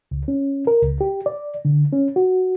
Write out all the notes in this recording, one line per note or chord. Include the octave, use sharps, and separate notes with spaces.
C#2
C#4
A#4
C#2
G4
D5
D3
C#4
F#4